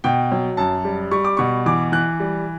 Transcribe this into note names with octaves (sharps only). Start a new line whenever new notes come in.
B2 G5
F#3
F#2 A5
G3
G3 C#6
D6
B2 C#6
E3 D6
E3 F#6
G3